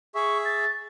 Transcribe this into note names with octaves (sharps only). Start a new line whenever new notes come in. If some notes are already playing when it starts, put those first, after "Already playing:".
G#4 E5 C#6
A6